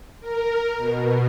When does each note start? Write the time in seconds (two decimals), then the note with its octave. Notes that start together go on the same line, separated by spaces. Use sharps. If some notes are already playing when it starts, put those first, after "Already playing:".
0.20 A#4
0.78 B2